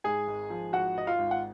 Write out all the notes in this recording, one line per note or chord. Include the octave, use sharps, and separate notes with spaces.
G#2 G#4 G#5
G#1
F3
G#1 F#4 F#5
G#2 D#5
F4 F5
G#1
F#5